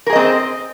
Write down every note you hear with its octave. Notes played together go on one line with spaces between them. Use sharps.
C4 G#4 A#4 C5 D#5